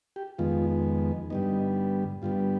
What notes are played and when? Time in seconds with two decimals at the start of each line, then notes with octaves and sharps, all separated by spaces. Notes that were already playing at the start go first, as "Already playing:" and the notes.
0.16 G4
0.38 F2 D#3 G#3 B3 F4
1.30 G2 D3 G3 B3 D#4
2.22 G2 D3 G3 B3 F4